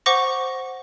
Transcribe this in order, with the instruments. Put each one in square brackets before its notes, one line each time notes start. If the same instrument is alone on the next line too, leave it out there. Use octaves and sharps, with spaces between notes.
[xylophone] C5 F#5 C#6 D6 A#6